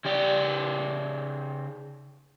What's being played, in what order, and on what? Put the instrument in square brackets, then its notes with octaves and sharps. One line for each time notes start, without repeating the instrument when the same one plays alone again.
[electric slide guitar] C#3 G4 D5